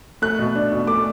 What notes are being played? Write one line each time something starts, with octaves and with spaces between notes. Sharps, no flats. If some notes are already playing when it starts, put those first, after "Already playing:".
A3 F#6
B2
D4
B2
A3 D6